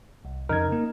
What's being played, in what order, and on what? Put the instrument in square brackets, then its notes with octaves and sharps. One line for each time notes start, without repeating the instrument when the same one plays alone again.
[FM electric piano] C2
[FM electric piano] F2 C#3 G#6 [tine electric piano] D#4 A#4
[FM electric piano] A#3